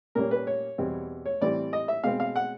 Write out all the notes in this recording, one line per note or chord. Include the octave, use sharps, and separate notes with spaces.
A#2 G3 A#3 C#4 A#4
B4
C#5
E2 B2 G3 C4
C#5
A2 E3 G3 C4 D5
D#5
E5
B2 G#3 C4 F5
F5
F#5